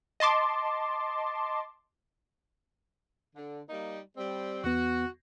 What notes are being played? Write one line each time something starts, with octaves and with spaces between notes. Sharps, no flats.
D#5 A5 C6 D6
D3
G3 A#3 D#4
G3 C4
E2 B3 F#4